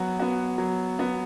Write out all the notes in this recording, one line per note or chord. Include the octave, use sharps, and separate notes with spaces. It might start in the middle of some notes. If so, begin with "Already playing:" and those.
Already playing: F#3 B3 F#4
B3 F#4
F#3
B3 F#4